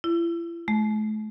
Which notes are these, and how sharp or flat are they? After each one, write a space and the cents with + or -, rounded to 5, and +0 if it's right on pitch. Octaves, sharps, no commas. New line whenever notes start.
E4 +40
A3 -40